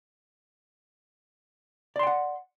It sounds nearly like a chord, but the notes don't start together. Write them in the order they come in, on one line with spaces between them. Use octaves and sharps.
D5 C6 G5 F#5